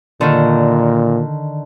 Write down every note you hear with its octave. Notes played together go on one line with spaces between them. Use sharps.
A#2 D3 D#3